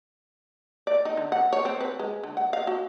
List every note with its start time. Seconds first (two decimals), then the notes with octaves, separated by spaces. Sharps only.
0.87 D5
1.05 D#4
1.17 D3
1.32 F#5
1.53 C#5
1.65 C4
1.81 B4
1.99 G#3
2.24 D3
2.37 F#5
2.53 F5
2.67 F#4